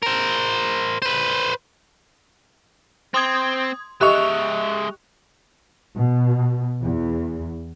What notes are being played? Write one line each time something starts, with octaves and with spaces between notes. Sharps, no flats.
A#4 C5
B4 C5
C4 C6 D#6 G#6
G#3 G4 D#5 E5 C#6 F#6 F7
B2
E2